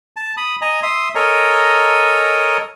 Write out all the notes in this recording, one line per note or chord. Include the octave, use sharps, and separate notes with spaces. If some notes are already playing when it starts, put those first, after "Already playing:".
A5
B5 D#6
D#5 G#5 A#5
E5 C6 D#6
A4 A#4 C#5 D#5 G#5 A#5